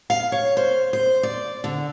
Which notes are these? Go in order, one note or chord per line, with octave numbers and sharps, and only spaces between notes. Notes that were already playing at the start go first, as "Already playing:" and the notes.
F5
C#5
C5
C5
D5
D3